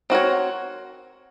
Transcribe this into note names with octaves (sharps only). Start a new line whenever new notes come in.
C4 F#4 A#4 C#5